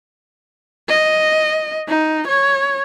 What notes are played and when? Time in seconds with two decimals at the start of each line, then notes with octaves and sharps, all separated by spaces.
0.89 D#5
1.88 D#4
2.27 C#5